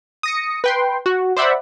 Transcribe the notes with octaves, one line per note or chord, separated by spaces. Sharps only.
D#6 A#6 C#7
B4 G5 C6
F#4
C5 D5 E5 F#5 B5